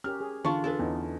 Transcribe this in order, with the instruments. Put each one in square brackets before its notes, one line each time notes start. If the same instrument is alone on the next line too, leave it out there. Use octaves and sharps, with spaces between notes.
[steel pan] C#4 G4 A#4 [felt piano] F6
[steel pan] G#4
[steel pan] D3 E3 [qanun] D4 F4 [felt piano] C#6
[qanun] D4 A4 [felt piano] G#4 B4
[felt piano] E2 [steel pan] B3 C#4 D#4